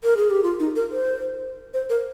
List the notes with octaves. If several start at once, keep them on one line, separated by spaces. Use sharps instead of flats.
A#4
G#4
G4
F4
D#4
A#4
C5
C5
A#4